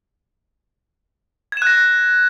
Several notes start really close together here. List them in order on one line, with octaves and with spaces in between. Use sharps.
G#6 E7 F#6 A#6